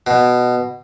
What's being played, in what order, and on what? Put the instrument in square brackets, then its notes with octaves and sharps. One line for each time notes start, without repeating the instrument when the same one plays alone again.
[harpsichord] B2